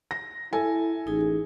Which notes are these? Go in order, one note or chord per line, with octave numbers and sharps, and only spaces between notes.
A#6
E4 A4 G#5
A1 D#4 G#4